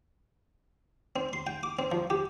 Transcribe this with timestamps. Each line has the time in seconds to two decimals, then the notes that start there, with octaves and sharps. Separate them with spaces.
1.16 C4
1.33 C6
1.47 G5
1.63 D6
1.79 C4
1.92 F3
2.10 G4